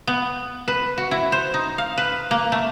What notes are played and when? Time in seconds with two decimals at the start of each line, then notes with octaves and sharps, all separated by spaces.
0.07 B3
0.68 B4
0.98 F#4
1.11 E4
1.32 C5
1.54 D#4
1.78 F5
1.98 B4
2.31 A#3
2.52 A3